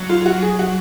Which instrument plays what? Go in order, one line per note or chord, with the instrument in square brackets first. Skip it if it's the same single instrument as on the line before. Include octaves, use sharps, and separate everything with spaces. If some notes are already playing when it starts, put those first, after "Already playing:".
Already playing: [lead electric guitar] F#3
[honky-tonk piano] F4
F4
F#4
G#4
F#4